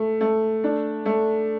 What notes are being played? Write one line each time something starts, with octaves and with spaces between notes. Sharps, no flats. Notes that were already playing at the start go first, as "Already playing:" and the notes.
Already playing: A3
A3
D4
A3